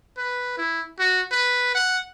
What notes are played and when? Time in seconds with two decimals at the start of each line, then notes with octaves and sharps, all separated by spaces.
0.17 B4
0.58 E4
0.99 F#4
1.31 B4
1.75 F#5